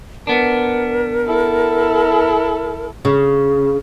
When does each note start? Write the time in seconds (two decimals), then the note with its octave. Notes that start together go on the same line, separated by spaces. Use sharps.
0.27 B3 D4 A#4
1.27 E4 A4
3.05 C#3